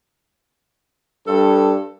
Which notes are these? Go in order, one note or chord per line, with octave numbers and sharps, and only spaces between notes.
G2 A4